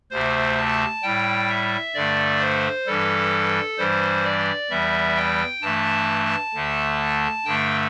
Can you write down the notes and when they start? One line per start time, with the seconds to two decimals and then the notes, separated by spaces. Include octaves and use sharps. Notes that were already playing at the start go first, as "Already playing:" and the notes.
0.11 D2 C3 A3 C5
0.58 A5
1.03 A2 G3 G5
1.49 E5
1.94 G2 D3 A3 D5
2.40 C5
2.87 G2 E3 G3 A4
3.78 G2 E3 G3 C5
4.25 D5
4.70 E2 E3 G3 E5
5.17 G5
5.62 G2 E3 A3 A5
6.54 D2 D3 A3
7.45 G2 D3 A3 G5